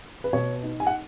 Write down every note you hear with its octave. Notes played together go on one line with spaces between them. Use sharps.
B4
B2 C#5
D#4
G#5
F#5